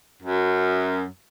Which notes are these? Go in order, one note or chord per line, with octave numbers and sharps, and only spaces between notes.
F#2